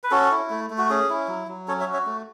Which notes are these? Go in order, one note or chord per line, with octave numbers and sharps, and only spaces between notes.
B4
C#4 F#4 A4
E4
A3
A3
F#4
C#4 G#4
E4
F#3
F#3
C#4 A4 C#5
C#5 E5
F#4
C#5 E5
A3